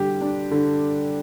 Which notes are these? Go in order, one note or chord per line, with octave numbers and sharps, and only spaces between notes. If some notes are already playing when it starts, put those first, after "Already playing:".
Already playing: D3 G3 G4
D4
D3